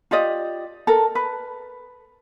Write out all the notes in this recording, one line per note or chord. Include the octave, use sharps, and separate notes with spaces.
F4 G4 D5 D#5
A4 A#4
B4